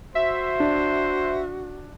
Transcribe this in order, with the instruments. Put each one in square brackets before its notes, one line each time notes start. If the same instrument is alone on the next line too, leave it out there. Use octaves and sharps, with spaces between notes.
[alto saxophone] F#4 [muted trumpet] C5 [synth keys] E5
[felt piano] D4